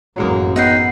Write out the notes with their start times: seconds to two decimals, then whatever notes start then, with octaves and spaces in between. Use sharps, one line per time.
0.16 A1 F#2 F#3 G#3 A#3
0.56 B3 D#4 B4 G5 C7